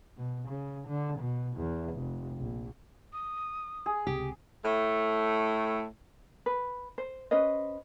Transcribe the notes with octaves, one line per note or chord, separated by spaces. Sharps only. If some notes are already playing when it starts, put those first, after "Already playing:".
B2
C#3
D3
B2
E2
F1
A#1
D#6
G#4
C#2 C3 G4
A2 A3
B4
C5
C#4 B4 C5 D#5